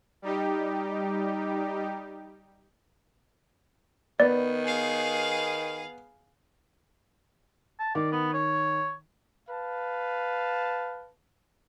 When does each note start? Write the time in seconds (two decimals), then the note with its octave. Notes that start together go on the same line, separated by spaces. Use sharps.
0.22 G3 D#4 G4
4.20 D#3 B3 D5
4.65 G#4 F5
7.79 A5
7.95 D#3 D5
8.12 B3
8.33 C#5
9.50 B4 F5 A5